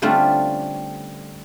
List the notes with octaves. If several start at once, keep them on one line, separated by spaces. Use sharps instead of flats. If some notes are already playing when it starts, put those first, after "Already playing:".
D3 G3 A3 C4 C#4 F4